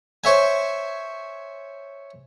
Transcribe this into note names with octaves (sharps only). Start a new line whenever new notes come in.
C5 C#5 E5 G#5